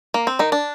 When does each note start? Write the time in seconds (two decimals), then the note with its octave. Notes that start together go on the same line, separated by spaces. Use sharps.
0.14 A#3
0.27 C4
0.39 D#3 D#4
0.52 D4